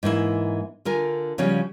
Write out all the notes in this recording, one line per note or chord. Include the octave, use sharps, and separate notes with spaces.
G#2 E3 A#3 E4
D3 F4 A#4 G#5
C#3 F3 G3 C#4 F#4